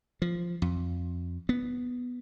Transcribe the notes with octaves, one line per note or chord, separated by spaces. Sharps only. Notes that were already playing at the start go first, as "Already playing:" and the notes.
F3
F2
B3